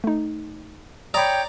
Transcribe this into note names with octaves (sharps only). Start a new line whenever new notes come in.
A3 D#4
C#5 D5 G5 A#5 B5 D#6